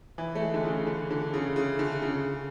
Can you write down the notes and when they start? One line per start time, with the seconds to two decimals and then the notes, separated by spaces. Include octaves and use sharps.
0.18 E3
0.35 A3
0.41 G#3
0.54 D3
0.64 C#3
0.87 D3
1.10 D3
1.34 C#3
1.56 C#3
1.79 D3
2.02 C#3